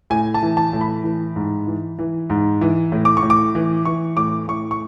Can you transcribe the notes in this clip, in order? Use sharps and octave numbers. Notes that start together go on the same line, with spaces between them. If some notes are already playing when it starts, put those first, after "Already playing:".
A2 G#5
A5
E3
A5
A2
B5
E3
G#2
E3
E3
G#2
E3
A2
D6
C#6
A2
D6
E3
E3 C#6
A2 D6
A2 C#6
C#6